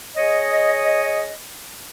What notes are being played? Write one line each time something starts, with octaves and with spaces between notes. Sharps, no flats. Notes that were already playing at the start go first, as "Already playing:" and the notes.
G#4 C#5 D#5